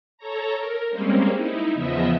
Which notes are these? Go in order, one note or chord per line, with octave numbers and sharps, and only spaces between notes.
A4 C#5 A#5
A#4
G3 G#3 A#3 C4 C#4
D#4 E4
E2 C#3 F3 B3 D#5 E5